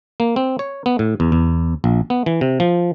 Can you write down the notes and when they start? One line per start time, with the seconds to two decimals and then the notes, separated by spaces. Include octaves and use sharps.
0.20 A#3
0.36 C4
0.59 C#5
0.86 B3
0.99 A2
1.20 E2
1.32 E2
1.84 A#1
2.10 B3
2.26 E3
2.41 C3
2.60 F3